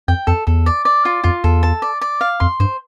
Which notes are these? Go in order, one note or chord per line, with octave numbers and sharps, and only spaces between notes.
F2 G5
F2 A4
E2 A4
D5
D5
F4
F2 F4
E2 A4
A5
D5
D5
F5
F2 C6
G2 C5